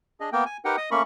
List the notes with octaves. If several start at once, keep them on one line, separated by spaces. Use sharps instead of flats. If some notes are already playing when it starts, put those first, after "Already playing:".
D4 G#4 D#5
A#3 B3 A#4 G5
G#5
D#4 G4 A#4 B4 F#5 G5
D#5 D#6
A3 A#3 C#4 A#4 B5 C#6